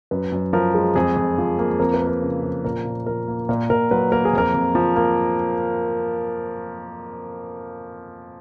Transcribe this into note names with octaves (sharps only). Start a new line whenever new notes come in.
F#2 B4
F#2
F3 A#4
G#3
F2 G#4
F2
F3
A#3
F2 A#4
B4
A#3
A#4
C#3
F3
A#2 A#4
A#2
F3 A#4
A#3
A#2 A#4
A#2 A#4
F#3 B4
A#3 A#4
G#4
F2 A#4
F2
F3
A#3